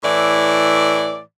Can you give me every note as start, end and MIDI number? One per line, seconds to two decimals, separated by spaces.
0.03 1.19 45
0.03 1.19 52
0.03 1.19 74